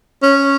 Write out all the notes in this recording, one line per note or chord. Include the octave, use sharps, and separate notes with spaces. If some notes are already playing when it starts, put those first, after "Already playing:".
C#4